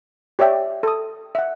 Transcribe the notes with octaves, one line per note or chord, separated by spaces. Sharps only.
G4 C#5 D5 E5 G5
A4 D#6
E5 F#5